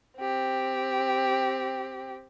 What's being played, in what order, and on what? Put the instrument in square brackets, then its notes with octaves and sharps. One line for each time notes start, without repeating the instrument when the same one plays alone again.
[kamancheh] C4 G4